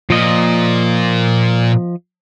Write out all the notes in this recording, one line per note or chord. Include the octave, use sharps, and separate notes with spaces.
A#2 F3 D#5